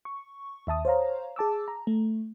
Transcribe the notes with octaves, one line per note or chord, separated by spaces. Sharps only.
C#6
D#2 E5 A5 D#6
C5 C#5 F5 A#5
G#4 A5 D6 E6
A#5
A3